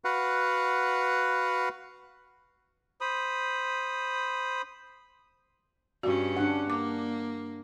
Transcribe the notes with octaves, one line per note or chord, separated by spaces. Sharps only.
F#4 B4 F5 F#5
C5 B5 D#6
G2 C#4 F#4 D5
D4 F#5
A#3 D6